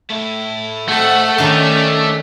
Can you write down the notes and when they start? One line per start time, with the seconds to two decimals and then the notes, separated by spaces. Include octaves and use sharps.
0.10 A3 E4
0.88 A3 C4 F#4 A4 F#5
1.38 D#3 C#4 D4 A5